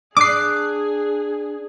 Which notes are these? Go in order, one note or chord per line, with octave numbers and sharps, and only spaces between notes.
D4 G#4 D6 D#6 F#6 C7